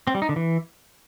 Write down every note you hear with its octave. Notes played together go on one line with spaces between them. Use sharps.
C4
G3
D#4
D3
E3